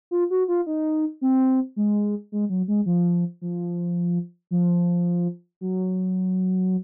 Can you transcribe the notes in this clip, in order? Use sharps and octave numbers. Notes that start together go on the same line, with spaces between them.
F4
F#4
F4
D#4
C4
G#3
G#3
F#3
G#3
F3
F3
F3
F#3